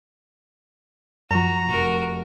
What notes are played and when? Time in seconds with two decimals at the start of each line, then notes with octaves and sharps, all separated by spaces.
1.31 F#2 F3 F#4 A#5
1.68 F1 F#4 A#4